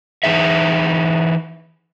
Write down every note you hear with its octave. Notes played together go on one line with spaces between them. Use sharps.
E3 D#4 G#4 E5